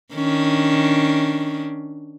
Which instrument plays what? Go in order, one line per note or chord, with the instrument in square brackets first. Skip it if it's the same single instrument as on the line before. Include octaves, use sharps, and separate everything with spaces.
[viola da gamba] D#3 C#4 D4